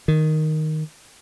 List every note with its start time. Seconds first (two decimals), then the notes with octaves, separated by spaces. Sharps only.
0.08 D#3